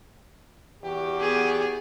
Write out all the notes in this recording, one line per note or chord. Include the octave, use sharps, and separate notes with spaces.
E2 F#4 G4
B3 G#4